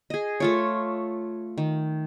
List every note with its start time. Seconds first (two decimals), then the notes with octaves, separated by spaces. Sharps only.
0.10 G#4 D#5
0.40 A3 F4 C#5
1.58 D#3